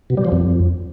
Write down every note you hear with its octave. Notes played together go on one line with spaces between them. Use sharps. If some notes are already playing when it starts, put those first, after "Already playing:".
B2
G3
F3
F2